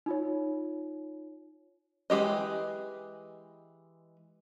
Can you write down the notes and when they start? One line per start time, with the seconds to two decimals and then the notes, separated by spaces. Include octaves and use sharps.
0.06 D#4 F4 C#5
2.10 E3 G#3 G4 D#5